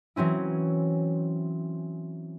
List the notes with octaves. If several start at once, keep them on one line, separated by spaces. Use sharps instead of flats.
E3 F#3 C4 C#4 E4